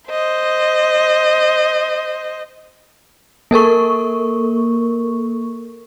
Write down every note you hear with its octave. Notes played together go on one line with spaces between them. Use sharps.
C5 D#5
A#3 A4 A#4 C#6